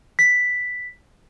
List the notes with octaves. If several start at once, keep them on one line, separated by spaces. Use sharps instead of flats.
B6